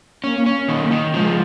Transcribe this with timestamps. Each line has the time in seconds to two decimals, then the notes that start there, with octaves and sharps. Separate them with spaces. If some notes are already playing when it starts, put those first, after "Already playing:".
0.23 A#3 C#4
0.46 C#4
0.68 D#3 A#3
0.91 D#3
1.14 F3 G#3